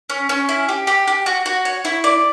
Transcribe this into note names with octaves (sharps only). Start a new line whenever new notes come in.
C#4
C#4
E4
G4
G4
G4
F#4
F#4
C#5
E4
D5